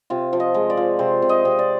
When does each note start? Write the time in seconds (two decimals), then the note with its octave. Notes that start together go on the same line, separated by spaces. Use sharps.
0.10 C3 F4
0.33 F3
0.40 D#5
0.54 G#3
0.70 D5
0.77 F3
0.99 C3 C5
1.22 C3
1.29 D#5
1.45 C3
1.59 D5